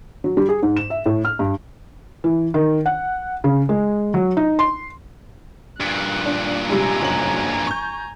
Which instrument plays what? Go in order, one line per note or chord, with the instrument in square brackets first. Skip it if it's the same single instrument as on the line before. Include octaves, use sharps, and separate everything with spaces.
[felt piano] F#3
G3
G#4
G#2
E7
E5
A2
F6
G2
E3
D#3
F#5
C#3
G#3
F#3
D#4
C6
[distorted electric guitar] G2 A#2 [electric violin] F#6
[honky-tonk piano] D4
[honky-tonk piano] C3 G3 G#3 [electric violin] G#5 A#5
[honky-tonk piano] F#1 F#3 F#7
C#6 G6